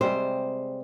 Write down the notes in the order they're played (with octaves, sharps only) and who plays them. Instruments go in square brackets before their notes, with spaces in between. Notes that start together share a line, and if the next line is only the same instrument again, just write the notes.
[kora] C3 G3 G#3 [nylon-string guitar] C5